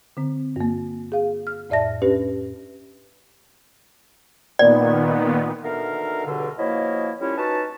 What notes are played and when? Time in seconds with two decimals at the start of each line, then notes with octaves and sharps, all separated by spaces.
0.17 D3 C4
0.56 G2 A#3
1.12 G#4 F5
1.47 F6
1.70 F2 A2 D5 E5 A5 A#6
2.02 C#4 D4 G4 B4
4.59 A#2 D#3 B3 D5
5.64 B2 D3 D#4 A#4 E5 F5
6.26 C#2 G2 B2 D3
6.59 B2 F3 A#3 E4 C#5 D#5
7.20 C2 G3 C#4 E4 F4 C#5
7.37 C#4 D#4 F#4 B4 A5